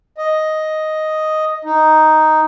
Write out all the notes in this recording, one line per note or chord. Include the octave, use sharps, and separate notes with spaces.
D#5
D#4